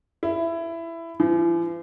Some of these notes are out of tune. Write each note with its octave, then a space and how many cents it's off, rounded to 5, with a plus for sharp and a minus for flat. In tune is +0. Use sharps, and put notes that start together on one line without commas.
E4 +15
E3 +45